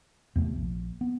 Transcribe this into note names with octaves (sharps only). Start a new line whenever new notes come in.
E2 C3 A3
A#1
B3